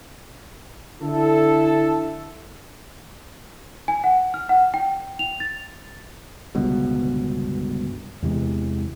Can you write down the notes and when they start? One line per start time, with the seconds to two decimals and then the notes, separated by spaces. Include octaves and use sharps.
1.02 D3 E4 A4
3.88 G#5
4.04 F#5
4.34 F6
4.49 F#5
4.74 G5
5.19 F7
5.40 A6
6.55 G1 C#2 G2 B2
8.22 E2 C3 E3 G#3